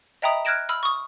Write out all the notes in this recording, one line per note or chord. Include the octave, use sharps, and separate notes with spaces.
D#5 E5 G5 A#5 B5 D#6
F6 F#6 G#6 A#6 D7 E7
B5 E6 F6
C#6 D#6